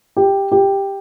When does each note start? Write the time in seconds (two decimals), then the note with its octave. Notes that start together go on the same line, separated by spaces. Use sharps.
0.17 G4
0.52 G4